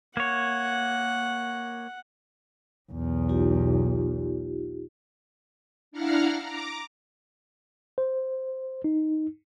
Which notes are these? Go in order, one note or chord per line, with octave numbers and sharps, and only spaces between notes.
A#3 C#5 F#5
B1 E2
D#4 F4 G4
D4 E4 F5 F#5 A#5 F6
A#5 D6
C5
D#4